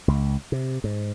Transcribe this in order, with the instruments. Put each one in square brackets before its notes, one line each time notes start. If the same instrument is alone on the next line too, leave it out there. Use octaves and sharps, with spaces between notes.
[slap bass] C#2
C3
G#2